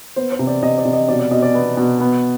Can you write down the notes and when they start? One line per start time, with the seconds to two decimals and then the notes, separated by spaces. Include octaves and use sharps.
0.16 B3 C5
0.32 C5
0.39 C3
0.47 D5
0.63 C3 D#5
0.78 D5
0.85 C3
0.93 D#5
1.08 B2 D5
1.19 D5
1.31 B2 D#5
1.42 D5
1.54 B3
1.77 B2
2.00 B3